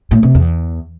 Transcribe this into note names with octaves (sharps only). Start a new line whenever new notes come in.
A2
C3
E2